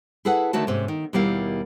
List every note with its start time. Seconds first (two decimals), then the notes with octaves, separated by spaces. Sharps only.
0.25 E4 G#4 A4 B4 F#5
0.53 D3 D#3 A3 F#4 C#5 A5
0.67 G#2 C3 C#4
0.88 D#3
1.13 D#2 B2 G3 A#3 E4 F5